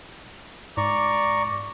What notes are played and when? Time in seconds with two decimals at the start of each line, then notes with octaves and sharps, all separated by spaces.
0.77 G#2 D5 A#5 C#6 D6